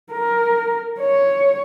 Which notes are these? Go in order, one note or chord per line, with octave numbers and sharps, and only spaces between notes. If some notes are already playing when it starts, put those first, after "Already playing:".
A#4
C#5